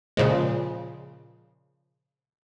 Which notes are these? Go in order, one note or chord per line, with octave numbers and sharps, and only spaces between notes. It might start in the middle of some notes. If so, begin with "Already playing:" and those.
A#2 C#3 F3 G#3